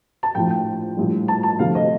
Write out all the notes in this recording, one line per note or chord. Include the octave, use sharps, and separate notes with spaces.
A5
A#1 A2 F3 G5
G5
A#1 A2 G3
A5
A5
D2 C3 F3 A3 F5
D#5